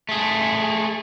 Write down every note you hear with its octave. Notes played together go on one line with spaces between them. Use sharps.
A3 G#4